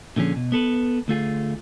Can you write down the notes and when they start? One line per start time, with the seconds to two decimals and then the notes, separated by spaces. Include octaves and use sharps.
0.16 A#2 D3 F3 C#4 G#4
0.36 B2
0.52 B3 A4 B4
1.08 D2 A3 F4 G#4